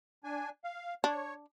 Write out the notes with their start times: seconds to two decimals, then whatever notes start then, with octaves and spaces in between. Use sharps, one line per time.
0.24 D4 G#5
0.64 F5
1.04 D4 C#5